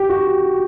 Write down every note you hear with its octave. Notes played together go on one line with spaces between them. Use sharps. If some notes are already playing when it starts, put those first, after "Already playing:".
Already playing: G4
F#4